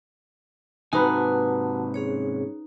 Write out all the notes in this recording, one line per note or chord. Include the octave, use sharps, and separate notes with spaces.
G#2 C3 D#4 F#4 B4 F#5 G#5 A5
C#4 G#4 C#5